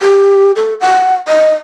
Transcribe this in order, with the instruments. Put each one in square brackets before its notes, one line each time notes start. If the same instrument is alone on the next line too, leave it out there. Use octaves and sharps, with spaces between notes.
[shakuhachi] G4
A4
F#5
D#5